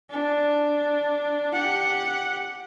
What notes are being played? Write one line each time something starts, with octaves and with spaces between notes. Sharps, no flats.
D4
G4 F#5